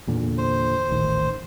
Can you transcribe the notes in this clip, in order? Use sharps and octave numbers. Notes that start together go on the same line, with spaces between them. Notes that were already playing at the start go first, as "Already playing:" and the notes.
E2 A#2 D3
C5
D#1 A1 D#3